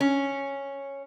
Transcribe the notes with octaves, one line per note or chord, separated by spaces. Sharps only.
C#4